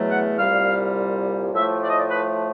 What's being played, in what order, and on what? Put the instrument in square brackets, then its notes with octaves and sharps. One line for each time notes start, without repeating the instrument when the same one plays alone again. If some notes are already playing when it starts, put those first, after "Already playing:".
Already playing: [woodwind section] E2 B2 F#3 A3
F#5
C2 A#2 G3 F5
A2 F3 A3 E5
D5
D#5
D5
B4